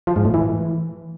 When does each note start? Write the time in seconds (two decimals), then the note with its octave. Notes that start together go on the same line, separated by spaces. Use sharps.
0.07 F3
0.16 G#2
0.25 A2
0.34 E3